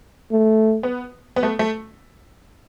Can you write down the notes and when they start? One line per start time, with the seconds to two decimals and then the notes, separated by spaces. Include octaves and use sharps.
0.31 A3
0.83 B3
1.36 B3
1.43 A3
1.59 A3